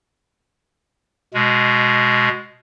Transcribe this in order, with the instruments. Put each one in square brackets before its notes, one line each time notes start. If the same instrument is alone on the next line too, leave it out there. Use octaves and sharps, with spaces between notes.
[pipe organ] B2 G#3